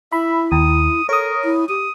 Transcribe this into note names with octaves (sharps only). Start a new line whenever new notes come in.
E4 E5 B5
D#2 D#6
A4 A#4 C#5 D#6
E4
G4 D#6